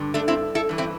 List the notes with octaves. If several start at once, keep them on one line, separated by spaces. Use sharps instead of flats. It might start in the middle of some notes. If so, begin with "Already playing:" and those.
Already playing: G2 D3
A3 D4
C4 E4
E4 A4
G2 E3
C4 E4